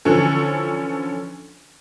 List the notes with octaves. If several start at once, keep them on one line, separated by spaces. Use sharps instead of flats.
D3 E3 F3 C#4 A4